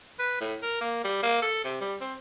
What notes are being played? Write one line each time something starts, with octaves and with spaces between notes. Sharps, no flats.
B4
A2
A#4
A#3
G3
A#3
A4
C3
G3
C4